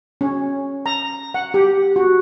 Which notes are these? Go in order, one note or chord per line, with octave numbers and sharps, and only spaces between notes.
C#4
A#5
F#5
G4
F#4